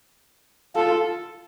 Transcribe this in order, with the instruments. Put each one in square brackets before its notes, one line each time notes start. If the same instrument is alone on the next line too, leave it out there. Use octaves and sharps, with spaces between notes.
[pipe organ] F4 [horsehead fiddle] A4